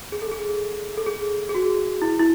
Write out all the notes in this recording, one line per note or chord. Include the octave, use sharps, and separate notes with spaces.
G#4
A4
G#4
A4
G#4
G#4
F#4
E4
E4